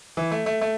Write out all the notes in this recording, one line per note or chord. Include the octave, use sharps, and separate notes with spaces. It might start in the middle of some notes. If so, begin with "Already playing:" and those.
E3
A3
A3
A3